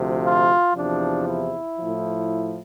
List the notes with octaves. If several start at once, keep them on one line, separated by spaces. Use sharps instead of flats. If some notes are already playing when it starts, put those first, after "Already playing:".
Already playing: D2 C3 F3
F4
E2 C3 F3 D4
E4
A2 F3